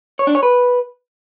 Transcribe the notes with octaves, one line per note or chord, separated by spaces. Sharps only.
C#5
D4
C#5
B4